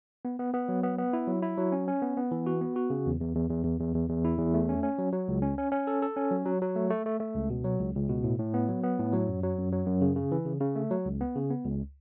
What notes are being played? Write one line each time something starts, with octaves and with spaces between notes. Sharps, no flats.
B3
B3
B3
F#3
B3
B3
E4
F#3
E4
F#3
C#4
C#4
B3
B3
E3
F#4
B3
F#4
C#3
E2
E2
E2
E2
E2
E2
E2
E2
E4
E2
A3
C#4
C#4
F#3
F#3
C#2
C#4
C#4
C#4
A4
A4
C#4
F#3
F#3
F#3
A3
A3
A3
A3
C#2
B2
F#3
C#2
C#2
B2
A2
A2
B3
F#3
B3
A2
F#3
F#2
F#3
F#2
F#3
F#2
C#3
C#3
E3
C#3
C#3
A3
F#3
C#2
B3
C#3
B3
C#2